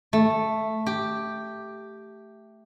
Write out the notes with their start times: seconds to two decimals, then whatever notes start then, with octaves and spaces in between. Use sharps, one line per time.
0.13 A3
0.86 G4